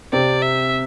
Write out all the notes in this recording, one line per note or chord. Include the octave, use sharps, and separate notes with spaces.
C3 C4 D5
E5